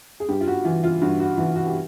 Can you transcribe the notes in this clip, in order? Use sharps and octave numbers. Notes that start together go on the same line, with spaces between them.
G#4
G2 G4
F4
F#4
E3 F4
F4
G2 F#4
F#4
E3 F#4
F#4
G4